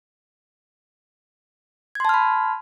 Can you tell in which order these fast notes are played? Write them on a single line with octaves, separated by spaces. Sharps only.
G#6 C6 A5 F6 B5